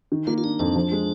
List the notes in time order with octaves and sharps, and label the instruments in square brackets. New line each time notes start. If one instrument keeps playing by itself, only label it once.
[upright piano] D#3
[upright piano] A#3 [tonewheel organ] F4
[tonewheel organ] F4
[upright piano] D4 [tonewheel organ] D#4
[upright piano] F2 [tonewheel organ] D4
[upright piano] F3
G#3